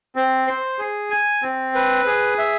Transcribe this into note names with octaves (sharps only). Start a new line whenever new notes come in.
C4
C5
G#4
G#5
C4
B4
G#4
E5